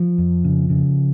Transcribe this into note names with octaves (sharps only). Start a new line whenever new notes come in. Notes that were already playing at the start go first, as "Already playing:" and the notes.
Already playing: F3
F2
C#3
C#3